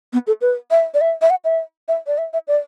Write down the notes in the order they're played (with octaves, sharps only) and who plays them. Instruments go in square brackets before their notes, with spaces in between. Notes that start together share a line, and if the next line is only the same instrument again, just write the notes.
[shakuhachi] B3
A4
B4
E5
D5
E5
E5
F#5
E5
E5
D5
E5
E5
D5